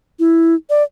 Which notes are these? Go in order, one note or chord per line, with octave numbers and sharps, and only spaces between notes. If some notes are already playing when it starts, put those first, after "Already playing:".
E4
D5